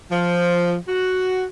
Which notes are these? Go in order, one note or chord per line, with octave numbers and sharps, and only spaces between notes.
F3
F#4